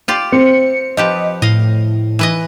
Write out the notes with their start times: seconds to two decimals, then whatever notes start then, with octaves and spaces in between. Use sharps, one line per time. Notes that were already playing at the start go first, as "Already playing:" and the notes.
0.08 F4 G4 D5
0.32 C4 C#7
0.97 F3 G4 B4 D#5
1.42 A2 D#5 F5
2.19 E3 B4 D#5